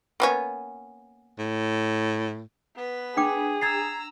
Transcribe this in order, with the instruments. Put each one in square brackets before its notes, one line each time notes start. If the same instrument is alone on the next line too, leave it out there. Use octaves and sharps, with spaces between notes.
[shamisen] A#3 B3 C#4
[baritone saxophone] A2
[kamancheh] B3 B4
[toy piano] D4 G5 D6 [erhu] G#4
[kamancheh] A#5 E6 [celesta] G#6 A6 C7